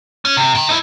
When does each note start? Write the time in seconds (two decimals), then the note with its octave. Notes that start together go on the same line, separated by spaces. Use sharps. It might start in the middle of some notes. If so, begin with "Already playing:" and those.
0.25 C#4
0.37 C3
0.55 G5 A#5
0.69 D#4 E4